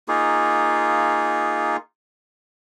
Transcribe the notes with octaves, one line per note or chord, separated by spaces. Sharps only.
A#3 D#4 F4 G#4